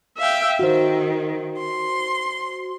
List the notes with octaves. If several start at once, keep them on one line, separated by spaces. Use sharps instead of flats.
E5 F5 G5
D#3 F#4 C5
C6